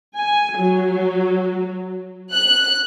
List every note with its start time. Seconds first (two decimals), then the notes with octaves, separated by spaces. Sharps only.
0.14 G#5
0.56 F#3
2.32 F#6